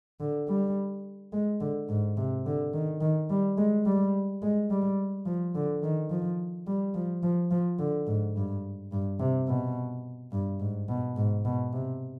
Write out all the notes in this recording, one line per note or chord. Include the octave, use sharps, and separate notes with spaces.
D3
G3
G#3
D3
G#2
C3
D3
D#3
D#3
G3
G#3
G3
G#3
G3
F3
D3
D#3
F3
G3
F3
F3
F3
D3
G#2
G2
G2
C3
B2
G2
G#2
B2
G#2
B2
C3